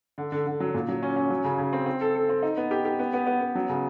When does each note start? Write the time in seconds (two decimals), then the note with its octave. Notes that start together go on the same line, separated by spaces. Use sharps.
0.18 D3
0.32 D3
0.46 D3
0.60 F#3
0.74 A#2
0.88 F#3
1.03 C#4
1.16 C#4
1.30 F#3
1.44 C#3
1.59 C#3
1.73 C4
1.86 C4
2.01 A4
2.15 A4
2.29 C4
2.43 D#4
2.57 B3
2.71 G4
2.85 G4
2.99 B3
3.13 B3
3.27 B3
3.41 B3
3.55 F#3
3.69 C#3